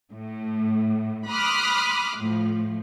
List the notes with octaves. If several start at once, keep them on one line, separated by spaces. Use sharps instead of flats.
A2
B5 C6 D6 D#6 F6 F#6
A2 F3